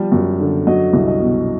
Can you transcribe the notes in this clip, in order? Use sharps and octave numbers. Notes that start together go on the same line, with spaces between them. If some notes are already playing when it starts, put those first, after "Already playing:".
Already playing: F3 G3
F#2
D3
F#3 D#5
C2
D#5
B2